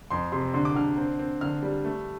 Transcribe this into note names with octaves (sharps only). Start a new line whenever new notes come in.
F2 C6
C3 C6
D3 C6
D6
D3 F6
C4
C4
D3 F6
G3
A3